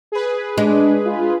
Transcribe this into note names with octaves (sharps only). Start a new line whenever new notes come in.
G#4 B4
G#3 D4
F4